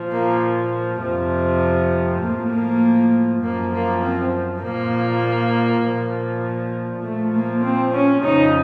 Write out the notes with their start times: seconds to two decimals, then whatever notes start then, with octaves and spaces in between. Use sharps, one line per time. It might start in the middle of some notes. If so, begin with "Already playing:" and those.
Already playing: A#2 F3
0.12 A#3
1.02 F2 C3 F3
2.22 A2 F3 A#3
2.52 A#3
3.42 F#2 F3 A#3
3.72 A#3
4.02 C4
4.62 A#2 F3 A#3
5.83 A#2 F3
7.03 A#2 F3 A3
7.33 A#3
7.63 C4
7.93 C#4
8.23 F2 C#3 F3 D#4